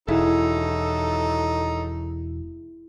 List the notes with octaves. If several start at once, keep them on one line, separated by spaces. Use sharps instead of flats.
E1 D#2 F#3 D#4 E4 G#4 A4